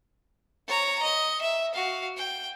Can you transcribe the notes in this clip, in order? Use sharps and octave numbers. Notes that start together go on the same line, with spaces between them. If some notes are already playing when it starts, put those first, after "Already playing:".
C#5 A#5
D#5
E5
F#4 F5
G5